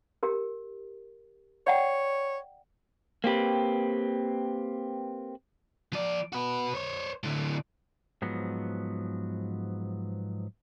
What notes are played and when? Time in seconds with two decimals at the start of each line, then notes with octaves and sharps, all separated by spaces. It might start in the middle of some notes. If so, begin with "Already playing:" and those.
0.23 G4 A#4
1.67 C#5 D5 F#5 G5
3.24 A#3 C4 G4 B4
5.93 F3 D5
6.33 F#4 B4
6.75 C5 C#5
7.23 A2 D3
8.22 G#2 F3 F#3 B3